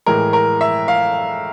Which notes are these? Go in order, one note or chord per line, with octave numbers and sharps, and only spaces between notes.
A2 E3 G#3 A#4
A#4
E5
F5